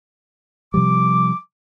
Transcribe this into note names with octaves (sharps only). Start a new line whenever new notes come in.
C3 F3 G3 D6